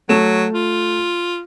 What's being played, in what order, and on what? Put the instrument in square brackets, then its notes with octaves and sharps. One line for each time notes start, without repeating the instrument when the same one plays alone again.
[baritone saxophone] F#3 [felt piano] A3 E7
[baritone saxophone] F4